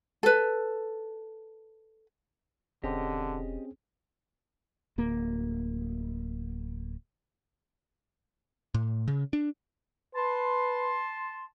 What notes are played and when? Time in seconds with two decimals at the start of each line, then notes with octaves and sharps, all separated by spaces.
0.23 A4 B4
2.84 E1 D3 C4 C#4 G4 G#4 D#5
4.98 D1 A#3
8.74 A2
9.08 C#3
9.33 D4
10.15 B4 A5 C6